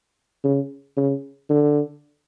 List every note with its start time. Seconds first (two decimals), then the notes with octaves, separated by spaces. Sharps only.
0.44 C#3
0.97 C#3
1.50 D3